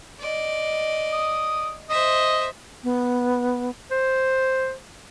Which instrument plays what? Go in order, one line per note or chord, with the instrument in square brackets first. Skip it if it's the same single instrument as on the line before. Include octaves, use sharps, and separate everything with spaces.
[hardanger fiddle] D5 D#5
[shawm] D#6
[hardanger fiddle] C5 E5 [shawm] D#5
[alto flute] B3
[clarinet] C5